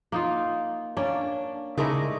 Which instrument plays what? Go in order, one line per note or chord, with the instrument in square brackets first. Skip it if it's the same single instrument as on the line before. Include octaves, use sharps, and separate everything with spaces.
[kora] A#3 D#4 F4
[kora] A#3 C#4 [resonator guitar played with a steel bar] D4
[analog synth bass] C#3 [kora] G#3 A3 E4 [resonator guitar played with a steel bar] D#4 A#4 D5